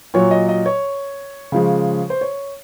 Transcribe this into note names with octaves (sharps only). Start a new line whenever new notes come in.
A#2 F#3 C#5
D#5
D#5
C#5
C#3 F3 G#3
C5
C#5